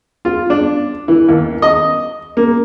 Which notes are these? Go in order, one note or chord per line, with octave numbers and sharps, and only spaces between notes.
F4
D4
E3
D#2
D#5
A#3